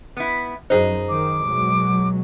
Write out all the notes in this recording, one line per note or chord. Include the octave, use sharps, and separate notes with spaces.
B3 E4
F#2 F#3 D#4 G#4 C5
D#3 D6
B2 F#3 G#3